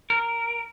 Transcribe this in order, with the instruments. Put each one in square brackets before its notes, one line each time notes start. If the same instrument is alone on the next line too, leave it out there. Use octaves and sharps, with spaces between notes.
[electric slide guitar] A#4